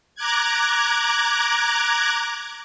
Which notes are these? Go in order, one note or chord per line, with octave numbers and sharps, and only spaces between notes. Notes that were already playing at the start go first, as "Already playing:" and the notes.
A#5 D6 F#6 G#6